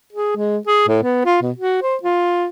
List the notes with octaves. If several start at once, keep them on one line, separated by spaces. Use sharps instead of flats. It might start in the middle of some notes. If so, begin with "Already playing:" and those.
G#4
G#3
G#4
A2
B3
F4
B2
F#4
C5
F4